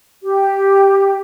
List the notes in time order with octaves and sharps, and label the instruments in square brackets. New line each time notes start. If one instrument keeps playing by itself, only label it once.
[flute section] G4